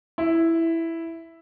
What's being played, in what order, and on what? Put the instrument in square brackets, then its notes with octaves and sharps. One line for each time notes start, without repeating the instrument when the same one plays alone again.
[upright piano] E4